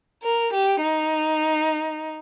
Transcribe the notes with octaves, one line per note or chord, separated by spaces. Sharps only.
A#4
G4
D#4